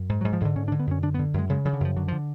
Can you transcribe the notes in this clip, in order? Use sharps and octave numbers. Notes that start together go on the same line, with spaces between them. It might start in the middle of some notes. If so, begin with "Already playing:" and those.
Already playing: F#2
G#2
F#3
G#2
F3
G#2 D3
D3 C#4
D4
D3
B3
F#2 C#4
D3 D4
B3
D3
F#2 G#3
C#3 G#3
C#3 F3
D3
F#2 F3
D3 F#3
F3
D3